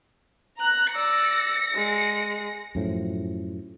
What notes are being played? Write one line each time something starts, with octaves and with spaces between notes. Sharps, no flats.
A#5 F#6
D5 E6 A#6 C#7
G#3
F#2 A2 F3